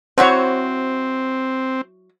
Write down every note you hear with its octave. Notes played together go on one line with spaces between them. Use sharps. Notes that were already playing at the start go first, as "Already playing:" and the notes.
F#3 C4 E4 F#4 C5 C#5